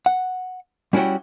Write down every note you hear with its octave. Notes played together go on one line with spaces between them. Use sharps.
F#5
G3 C#4 E4 F#4 C#5 G5